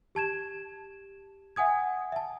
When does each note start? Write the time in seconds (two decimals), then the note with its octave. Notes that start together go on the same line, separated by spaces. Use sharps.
0.15 G4 A5 G#6 E7
1.56 E5 F#5 G#5 D#6 G#6
2.12 E5 A5